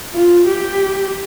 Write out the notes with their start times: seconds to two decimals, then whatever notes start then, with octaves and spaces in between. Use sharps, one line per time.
0.13 F4
0.48 G4